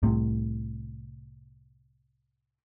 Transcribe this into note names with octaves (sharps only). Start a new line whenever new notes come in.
C2 A2 C3